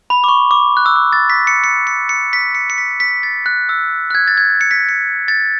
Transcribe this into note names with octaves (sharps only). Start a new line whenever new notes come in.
B5
D6
C#6
D6
F#6
E6
D6
A6
B6
C#7
C#7
C#7
C#7
B6
C#7
C#7
B6
B6
A6
F#6
E6
F#6
G#6
A6
G#6
C#7
B6
C#7
A6